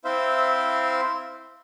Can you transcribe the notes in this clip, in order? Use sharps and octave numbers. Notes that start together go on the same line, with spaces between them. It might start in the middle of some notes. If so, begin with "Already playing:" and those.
C4 E4 C5 E5 F5 C6